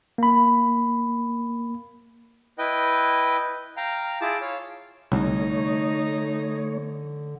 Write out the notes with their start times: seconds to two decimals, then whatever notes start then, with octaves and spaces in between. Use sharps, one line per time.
0.18 A#3 B5
2.58 E4 B4 D#5 G5
3.77 F5 G5 A#5 F6
4.21 E4 F4 G#4 A5 D6
4.41 C#5 F5
5.12 C2 D3 A3 D#4 C#5